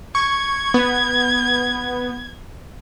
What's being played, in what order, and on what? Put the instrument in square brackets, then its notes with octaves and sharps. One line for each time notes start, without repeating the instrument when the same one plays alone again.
[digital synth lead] C#6 [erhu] G#6
[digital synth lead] B3